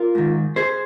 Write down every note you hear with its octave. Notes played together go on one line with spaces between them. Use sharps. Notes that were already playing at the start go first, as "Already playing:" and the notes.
Already playing: F4 A#4
G#2 D#3
G#4 C5